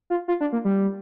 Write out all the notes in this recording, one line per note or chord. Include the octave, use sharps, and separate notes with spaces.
F4
F4
D4
A#3
G3